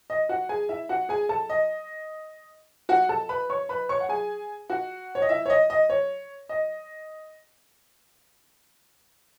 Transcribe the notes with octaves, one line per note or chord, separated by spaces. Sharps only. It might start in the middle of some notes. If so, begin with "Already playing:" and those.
D#5
F#4 F#5
G#4 G#5
E4 E5
F#4 F#5
G#4 G#5
A4 A5
D#5
F#4 F#5
A4 A5
B4 B5
C#5 C#6
B4 B5
C#5 C#6
F#5
G#4 G#5
F#4 F#5
C#5
D#5
E4 E5
C#5
D#5
D#5
C#5
D#5